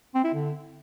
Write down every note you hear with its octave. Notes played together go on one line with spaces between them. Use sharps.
C4
E4
D3